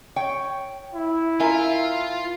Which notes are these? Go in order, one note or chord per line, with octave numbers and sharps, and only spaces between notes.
C#5 G5
E4
F4 A#4 E5 G#5